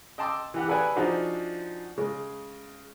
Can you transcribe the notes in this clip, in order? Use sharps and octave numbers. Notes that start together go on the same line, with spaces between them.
D#5 G5 A5 C6 D6 E6
E3 G4 F#5
G#4 A4 B4 D5 F#5 G#5
F3 D4 D#4 F#4 G#4 C5
C#3 G#3